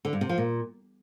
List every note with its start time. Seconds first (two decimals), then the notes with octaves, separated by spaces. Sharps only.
0.05 D3
0.13 G2
0.21 C3
0.29 F3
0.38 A#2